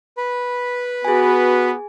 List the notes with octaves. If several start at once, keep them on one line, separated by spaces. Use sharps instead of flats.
B4 B5
B3 F#4 G#4 G#5